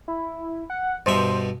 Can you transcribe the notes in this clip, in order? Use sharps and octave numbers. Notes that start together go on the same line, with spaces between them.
E4
F#5
G2 B2 C5 E5